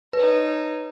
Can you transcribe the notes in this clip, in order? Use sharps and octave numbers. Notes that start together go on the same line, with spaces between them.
D#4 B4 C#5